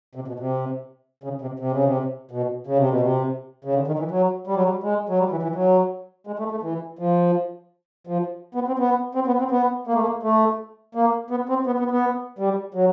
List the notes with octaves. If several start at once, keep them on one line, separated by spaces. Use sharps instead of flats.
C3
B2
C3
C#3
C3
C3
C#3
C3
B2
C#3
C3
B2
C3
C#3
D3
D#3
E3
F#3
G3
F#3
G3
G#3
F#3
G3
E3
E3
F#3
G#3
A3
A3
E3
F3
F3
B3
C4
B3
C4
B3
C4
B3
A#3
A3
A#3
A3
A#3
B3
C4
B3
B3
B3
G3
F#3